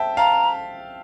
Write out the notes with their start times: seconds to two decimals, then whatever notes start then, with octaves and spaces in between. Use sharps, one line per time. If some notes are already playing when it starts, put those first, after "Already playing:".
Already playing: C5 E5 G5 A5
0.17 F5 A5 A#5